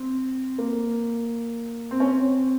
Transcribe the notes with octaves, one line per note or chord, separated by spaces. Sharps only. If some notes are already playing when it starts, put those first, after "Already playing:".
Already playing: C4
A#3
C4
C#4
C4